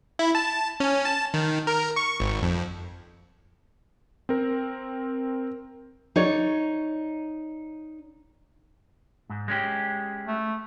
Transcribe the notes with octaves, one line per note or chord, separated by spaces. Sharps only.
E4
A5
C#4
A5
D#3
A#4
C#6
G#1
F2
C4 A#4
D#4 C#5 D5
G#2
G#3 C#4 G4
A3